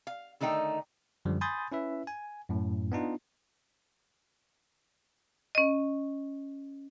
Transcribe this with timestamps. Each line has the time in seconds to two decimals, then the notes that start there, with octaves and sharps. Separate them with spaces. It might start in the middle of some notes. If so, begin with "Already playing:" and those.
0.07 F5
0.41 D3 D#3 A3 D#4 G5
1.25 F#2 D3 F3 G3
1.41 G#5 B5 C6 D#6 G6 A6
1.72 C#4 E4 B4 E5
2.07 G#5
2.49 F#2 A2
2.92 B3 D4 D#4 F4
5.55 C#4 D#5